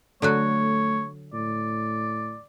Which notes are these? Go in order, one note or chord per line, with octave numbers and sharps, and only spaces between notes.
D3 F#3 A3 F#4 C#5
A2 D5